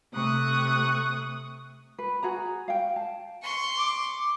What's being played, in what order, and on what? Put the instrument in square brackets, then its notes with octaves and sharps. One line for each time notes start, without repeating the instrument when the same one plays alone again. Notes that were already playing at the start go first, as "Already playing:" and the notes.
[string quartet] C3 A3 C#6 D#6 F#6
[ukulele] B4
F#4 G#4 A#5
F5 G5
A5
[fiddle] C6 C#6
[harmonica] D6